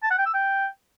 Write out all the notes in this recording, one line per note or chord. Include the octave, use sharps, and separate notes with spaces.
A5
F#5
G5
E6
G5